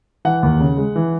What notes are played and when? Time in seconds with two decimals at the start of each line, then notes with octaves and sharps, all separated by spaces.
0.25 E3 F#5
0.43 D#2
0.60 C#3
0.77 G#3
0.95 E3